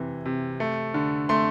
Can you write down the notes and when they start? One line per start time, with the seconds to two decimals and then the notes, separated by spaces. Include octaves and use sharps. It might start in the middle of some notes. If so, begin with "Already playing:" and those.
Already playing: C3 E3
0.25 C3
0.60 A3
0.94 D3
1.29 A3 C6